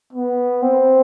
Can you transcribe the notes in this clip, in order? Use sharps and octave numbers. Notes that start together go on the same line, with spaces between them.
B3
C4